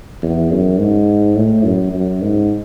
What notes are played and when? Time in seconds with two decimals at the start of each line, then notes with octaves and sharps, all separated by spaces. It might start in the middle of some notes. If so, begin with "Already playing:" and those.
0.23 E2
0.52 F#2
0.80 G#2
1.37 A2
1.65 F#2
1.93 F#2
2.22 G#2